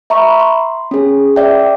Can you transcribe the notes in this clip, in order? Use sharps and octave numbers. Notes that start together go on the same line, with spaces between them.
E5 A#5 B5 C#6
C6
C#4 G#4
D5 E5 G5